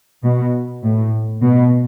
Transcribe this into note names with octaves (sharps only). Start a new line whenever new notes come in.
B2
A2
B2